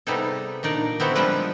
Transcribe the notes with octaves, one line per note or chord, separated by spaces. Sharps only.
C3 G3 B3 D#4 G#4 A4
A#2 D4 D#4 D5
B3 C4 E4 F#4 A4
F3 G3 G#3 D4 B4